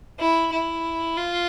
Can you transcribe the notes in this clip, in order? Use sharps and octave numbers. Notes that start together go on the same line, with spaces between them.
E4
E4
F4